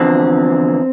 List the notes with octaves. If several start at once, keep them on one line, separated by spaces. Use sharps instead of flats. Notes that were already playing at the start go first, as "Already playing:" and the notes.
Already playing: E2 D3 F3 C4